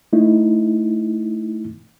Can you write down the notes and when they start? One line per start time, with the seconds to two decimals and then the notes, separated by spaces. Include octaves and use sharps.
0.13 A3 D#4 E4